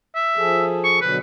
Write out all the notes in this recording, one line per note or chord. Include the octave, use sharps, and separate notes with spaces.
E5
F3 G#4 A4
C#6
B2 D3 F#3 B4